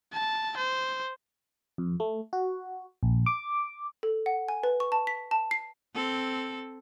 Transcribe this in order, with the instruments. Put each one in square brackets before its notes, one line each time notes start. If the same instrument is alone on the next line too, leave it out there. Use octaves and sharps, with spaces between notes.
[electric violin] A5
C5
[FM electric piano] F2
A3
F#4
A#1
D6
[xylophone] A4
F#5
G#5
B4
C#6
A5
B6
A5
C7
[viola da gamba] C4 A4